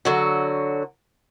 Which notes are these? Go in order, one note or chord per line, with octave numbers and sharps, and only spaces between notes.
D3 F#3 F#4